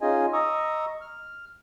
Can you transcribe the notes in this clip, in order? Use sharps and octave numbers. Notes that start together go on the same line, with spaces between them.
C#4 D#4 F4 G#4 D#5 G#5
D#5 A#5 C#6 D#6 E6
F6